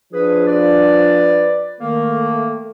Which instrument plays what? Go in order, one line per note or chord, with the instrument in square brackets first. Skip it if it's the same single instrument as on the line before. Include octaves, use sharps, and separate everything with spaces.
[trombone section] F3 D4 [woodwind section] G#4 B4
[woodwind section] B4 D5
[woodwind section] D#3 A#3 [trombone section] A3